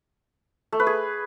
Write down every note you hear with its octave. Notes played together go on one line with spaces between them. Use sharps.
A3
B4
G#4